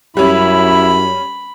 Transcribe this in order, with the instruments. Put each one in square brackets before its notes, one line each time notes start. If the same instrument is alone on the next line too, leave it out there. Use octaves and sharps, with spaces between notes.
[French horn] F#2 [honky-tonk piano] G3 C#4 [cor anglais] E4 [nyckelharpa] B5